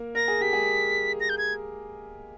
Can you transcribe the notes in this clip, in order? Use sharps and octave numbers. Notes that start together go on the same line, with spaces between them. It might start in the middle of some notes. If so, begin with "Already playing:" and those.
Already playing: A#3 A#4
A#4 A#6
G#4
G4 B6
G#3 G#4
A#6
G6
G#6